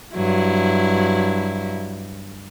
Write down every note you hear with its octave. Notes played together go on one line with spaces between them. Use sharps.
G2 F#3 E4